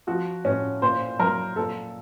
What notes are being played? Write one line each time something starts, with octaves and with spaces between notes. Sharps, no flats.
F3 F#4
A2 C#4
A#2 C5
F#3 A#4
A#2 A4